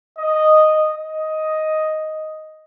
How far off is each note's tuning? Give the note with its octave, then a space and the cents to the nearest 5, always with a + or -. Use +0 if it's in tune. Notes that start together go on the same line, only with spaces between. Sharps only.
D#5 -5
D#5 +5